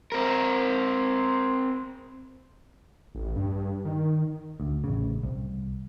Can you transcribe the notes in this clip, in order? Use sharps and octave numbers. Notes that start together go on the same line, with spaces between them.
C4 A#4
A1
G2
D#3
D2
A1 C#3
C2